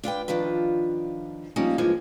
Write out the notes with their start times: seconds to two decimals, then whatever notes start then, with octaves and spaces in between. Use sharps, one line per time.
0.03 D4 F4 B4 G5
0.28 D#3 F3 D4 F4 B4
1.56 F3 G3 A#3 C#4 D#4
1.78 G2 E3 F3 G#3 A#3 G#5